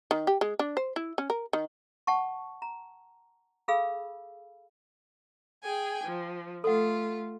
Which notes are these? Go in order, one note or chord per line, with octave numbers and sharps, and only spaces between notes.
D#3
G4
G#3
D4
C5
E4
C#4
A#4
D#3
F#5 A5 C#6
A#5
G#4 A4 F5 B5 E6
G#4 G5 G#5
F3
A3 F4 A4 F#5